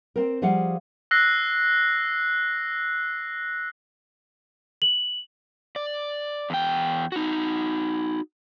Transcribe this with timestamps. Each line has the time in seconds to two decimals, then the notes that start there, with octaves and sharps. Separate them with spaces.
0.16 C4 A#4
0.42 F3 G3 G#4 F5 F#5
1.11 E6 F#6 A#6 C7
4.82 F#7
5.76 D5
6.50 E2 G5
7.12 D#4 F#4